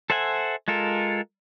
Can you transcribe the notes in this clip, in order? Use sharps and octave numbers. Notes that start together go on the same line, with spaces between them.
A4 C5 E5 F#5 G#5
G#3 F4 A4 A#4